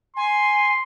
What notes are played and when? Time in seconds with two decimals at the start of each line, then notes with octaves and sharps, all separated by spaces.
0.17 G#5 C6